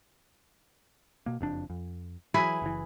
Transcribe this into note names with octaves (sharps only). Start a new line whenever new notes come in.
B2 A#3
F#1 F2 D4
F2
E3 F#3 E4 G#4 B4
F#1 E3